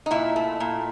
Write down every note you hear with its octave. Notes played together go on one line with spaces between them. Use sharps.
D#4
A#2 E4
A3
A#2